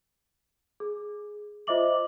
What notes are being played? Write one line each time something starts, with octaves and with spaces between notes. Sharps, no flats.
G#4
F4 C5 D#5 E5 D6 F#7